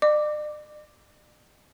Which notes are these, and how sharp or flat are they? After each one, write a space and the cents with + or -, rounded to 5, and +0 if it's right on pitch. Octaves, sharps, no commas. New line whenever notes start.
D5 +40 D6 +0